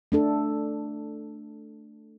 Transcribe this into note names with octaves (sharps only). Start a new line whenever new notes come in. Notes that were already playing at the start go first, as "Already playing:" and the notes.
A3 D4 A4